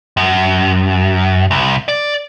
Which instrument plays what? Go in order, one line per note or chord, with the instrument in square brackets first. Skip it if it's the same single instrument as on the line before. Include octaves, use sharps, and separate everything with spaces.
[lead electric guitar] F#2
C2
D5